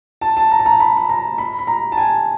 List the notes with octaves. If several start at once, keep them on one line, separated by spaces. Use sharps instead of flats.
A5
A5
A#5
A5
A#5
B5
B5
A#5
B5
B5
A#5
A5
G#5